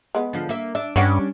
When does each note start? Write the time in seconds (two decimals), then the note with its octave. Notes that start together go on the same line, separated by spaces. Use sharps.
0.15 G#3 B3
0.33 D3 F3
0.49 A#3 E5
0.75 D4 E5
0.96 G2 G3 C#4 D4 C#5 F#5